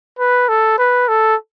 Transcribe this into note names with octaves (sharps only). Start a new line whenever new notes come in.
B4
A4
B4
A4